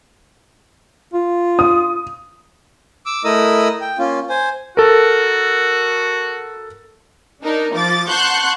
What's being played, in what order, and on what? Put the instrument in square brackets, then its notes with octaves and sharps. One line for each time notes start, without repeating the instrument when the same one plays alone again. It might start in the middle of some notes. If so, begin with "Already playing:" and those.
[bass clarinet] F4
[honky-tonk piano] D#6
[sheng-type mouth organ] D6 E6
A3 E4 A#4 D#5 D#6 E6
G5
A#3 C#4 F4
C5 G#5
[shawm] F#4 [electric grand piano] A4 A#4
[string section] D4 D#4 A#4
F3 D6 A6
F#5 A5 C6 C#6 F#6 G6